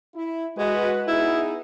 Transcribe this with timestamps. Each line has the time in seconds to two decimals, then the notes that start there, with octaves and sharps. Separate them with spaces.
0.14 E4
0.58 G#3 F#4 B4
1.08 B3 D#4 E4 G#4